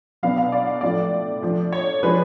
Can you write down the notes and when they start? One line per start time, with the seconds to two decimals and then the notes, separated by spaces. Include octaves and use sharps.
0.23 B2 F#3 B3 D4 F5
0.38 F5
0.52 D5
0.67 F5
0.81 A2 F3 A3 D4 D5
1.42 F3 A3 D4
1.73 C#5
2.03 F3 G#3 D4 B4